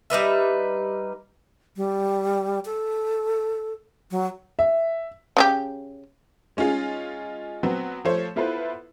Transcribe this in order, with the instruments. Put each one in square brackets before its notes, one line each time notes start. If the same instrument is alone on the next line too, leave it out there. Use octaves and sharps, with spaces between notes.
[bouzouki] G3 D#4 B4 E5
[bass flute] G3
A4
F#3
[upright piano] E5
[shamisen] C#3 D#4 G4
[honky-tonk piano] G#3 C#4 D#4 F4 G#4
F#3 B3 C4
F3 A3 A4 C5 C#5
B3 E4 F4 A4 B4 C5